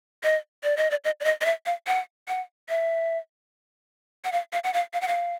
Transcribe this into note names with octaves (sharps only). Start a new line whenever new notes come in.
D#5
D5
D#5
D5
D#5
D5
D#5
D#5
E5
F5
F#5
F#5
E5
F#5
F5
F5
F#5
F5
F5
F#5
F5